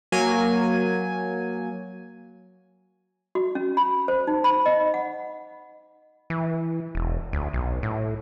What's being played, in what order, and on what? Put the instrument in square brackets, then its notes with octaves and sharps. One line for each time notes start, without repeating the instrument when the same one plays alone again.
[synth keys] F#3 A#3 G#5
[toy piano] F#4
C#4
B5
C5
D#4
B5
D#5
F#5
[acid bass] E3
E1
D2
B1
A2